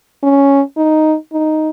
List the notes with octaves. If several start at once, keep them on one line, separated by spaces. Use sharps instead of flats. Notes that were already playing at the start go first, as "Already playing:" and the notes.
C#4
D#4
D#4